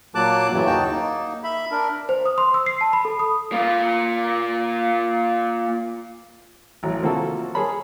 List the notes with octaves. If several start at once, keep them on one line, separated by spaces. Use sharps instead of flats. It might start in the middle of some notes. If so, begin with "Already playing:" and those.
A#2 F#3 A#3 A5 D6 F#6
F#2 A2 C#3 E3 F#3
D#2 D#4 F#4 G5 A5
A#3 D#4
E5 B5
D4 A#4
C5
D#6
C6
E6
C7
A5
B5
A4
D#6
A#3 F4
A1 F#3
C3 F3 A#3 F4 F#4 A4
G#4 A#4 C#5 A5 B5